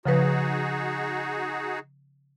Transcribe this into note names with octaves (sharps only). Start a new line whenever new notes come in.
C#3 F3 D#4 F#4 G#4 B4